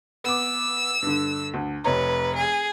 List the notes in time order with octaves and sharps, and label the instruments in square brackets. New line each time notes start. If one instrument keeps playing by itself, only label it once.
[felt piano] B3 D6 [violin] E6
[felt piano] G2 D3
D2
[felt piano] F1 C#5 A#5 [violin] B4
[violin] G#4